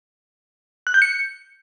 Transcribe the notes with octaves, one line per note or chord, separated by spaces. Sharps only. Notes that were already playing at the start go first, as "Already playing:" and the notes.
F#6
G6
C#7